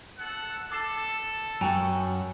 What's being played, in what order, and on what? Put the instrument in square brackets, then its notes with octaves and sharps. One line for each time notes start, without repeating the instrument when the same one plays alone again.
[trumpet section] A4 F#5
[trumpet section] A4 [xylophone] D6 C7 E7
[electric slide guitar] F#2 F#4 [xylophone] G5 G#5 A#5